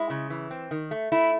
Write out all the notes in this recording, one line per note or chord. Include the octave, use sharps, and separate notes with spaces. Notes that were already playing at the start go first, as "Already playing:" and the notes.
Already playing: G#3 E4
C#3
E3
C4
D#3
A3
A3 E4